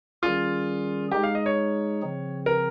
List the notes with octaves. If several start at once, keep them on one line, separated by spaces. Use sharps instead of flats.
D#3 G3 C#4 F4 G#4
G#3 D#4 G4 G#4
F5
D#5
C#5
C#3 F3 C4
A#4